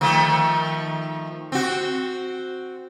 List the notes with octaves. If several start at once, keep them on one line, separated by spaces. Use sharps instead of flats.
D#3 F3 A3
C4 F#4